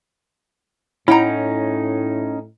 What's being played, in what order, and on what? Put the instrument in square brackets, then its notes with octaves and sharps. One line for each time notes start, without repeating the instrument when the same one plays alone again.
[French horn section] A2 [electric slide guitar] C#4 D#4 [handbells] E4 [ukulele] F#5 G5 A#5